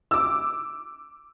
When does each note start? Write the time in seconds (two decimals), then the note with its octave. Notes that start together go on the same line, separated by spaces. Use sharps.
0.11 D6 E6